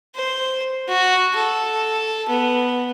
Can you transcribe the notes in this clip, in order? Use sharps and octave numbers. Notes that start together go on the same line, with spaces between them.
C5
F#4
A4
B3